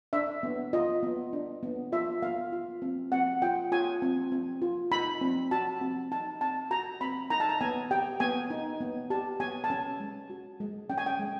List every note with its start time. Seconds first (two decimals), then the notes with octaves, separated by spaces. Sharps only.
0.13 D4 E5
0.43 B3
0.73 F4 D#5
1.03 B3
1.33 D4
1.63 B3
1.92 F4 E5
2.22 B3 F5
2.52 F4
2.82 C4
3.12 C4 F#5
3.42 F4 G5
3.72 F4 G#5
4.02 C4
4.32 C4
4.62 F4
4.91 D#4 B5
5.21 C4
5.51 F#4 A5
5.81 C4
6.11 D#4 A5
6.41 C4 A5
6.71 F#4 A#5
7.01 C4 B5
7.30 D#4 A#5
7.40 A5
7.49 A#5
7.61 B3 G#5
7.91 G4 G5
8.20 B3 G#5
8.50 D#4
8.81 B3
9.10 G4 A5
9.40 B3 G#5
9.64 A5
9.70 C#4 G#5
10.00 G#3
10.30 F#4
10.60 G#3
10.90 C#4 G5
10.98 G#5
11.06 G5
11.20 G#3